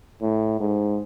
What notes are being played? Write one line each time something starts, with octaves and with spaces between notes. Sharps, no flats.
A2
G#2